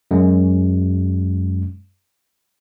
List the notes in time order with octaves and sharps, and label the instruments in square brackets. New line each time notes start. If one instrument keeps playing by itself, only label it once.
[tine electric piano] F#2 G#3